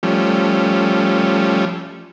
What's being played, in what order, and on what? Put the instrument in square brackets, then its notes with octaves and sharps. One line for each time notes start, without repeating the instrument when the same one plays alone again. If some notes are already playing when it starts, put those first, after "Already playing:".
[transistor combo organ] F3 G3 A3 C#4